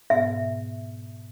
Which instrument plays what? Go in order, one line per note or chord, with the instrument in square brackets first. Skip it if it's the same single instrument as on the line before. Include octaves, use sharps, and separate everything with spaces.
[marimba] G#2 B2 B3 [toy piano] E5